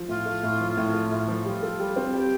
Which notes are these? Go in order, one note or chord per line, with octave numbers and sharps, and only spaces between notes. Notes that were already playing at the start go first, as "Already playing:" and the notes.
Already playing: F3
A2 F4
A3
A2
F3
A2
A3
A2
F3
G3 F4 G4
A4
G3
C4
G3 G4